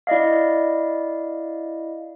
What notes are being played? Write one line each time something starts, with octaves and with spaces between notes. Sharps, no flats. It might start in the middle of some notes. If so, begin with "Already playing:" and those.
E4 D5 D#5 F5